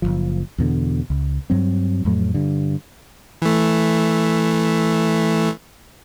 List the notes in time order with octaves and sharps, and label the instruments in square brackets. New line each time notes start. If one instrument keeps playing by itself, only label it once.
[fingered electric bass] F#1 C2 F3
E2 B2 D3
C#2
G2 F#3 C4
F2 A2 F#3 A3
G2 D3
[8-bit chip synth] E3 A3